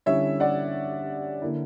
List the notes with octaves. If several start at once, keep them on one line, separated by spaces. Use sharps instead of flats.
D3 G3 C#4 E4 C#5 E5
D5 F#5
D3 A#3 E4